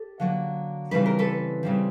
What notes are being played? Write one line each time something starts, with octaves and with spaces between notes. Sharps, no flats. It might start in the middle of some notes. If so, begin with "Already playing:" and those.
Already playing: G4 A4
D3 F#3 A#3
C#3 E3 G3 C4 B4
A#4
A4 B4
C#3 E3 G3 C4